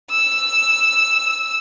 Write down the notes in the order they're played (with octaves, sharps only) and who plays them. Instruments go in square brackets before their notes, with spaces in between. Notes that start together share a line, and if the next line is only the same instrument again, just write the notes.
[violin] E6